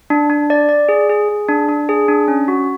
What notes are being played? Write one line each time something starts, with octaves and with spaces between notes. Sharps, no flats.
D4
D4
D5
D5
G#4
G#4
G#4
D4
D4
G#4
D4
C#4
F#4